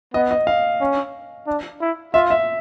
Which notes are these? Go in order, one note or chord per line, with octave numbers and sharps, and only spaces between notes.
B3 D#5
D#5
F5
C#4
D4
E4
F4 E5
E5